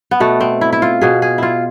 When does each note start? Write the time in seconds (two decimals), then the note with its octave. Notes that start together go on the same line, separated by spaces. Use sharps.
0.11 B3
0.20 B2 A3
0.40 C4
0.61 E4
0.73 E4
0.82 F4
1.01 B2 G#4
1.22 G#4
1.38 E4 F4